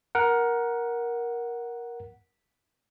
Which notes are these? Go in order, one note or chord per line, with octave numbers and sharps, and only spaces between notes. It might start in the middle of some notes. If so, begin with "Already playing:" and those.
A#4 F#5